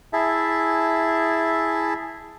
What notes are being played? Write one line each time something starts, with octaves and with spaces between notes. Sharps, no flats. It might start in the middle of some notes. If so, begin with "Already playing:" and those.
E4 G#4 E5 A5